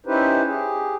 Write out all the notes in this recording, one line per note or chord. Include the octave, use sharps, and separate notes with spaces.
C#4 D#4 E4 G4 B4 C5
G4 G#4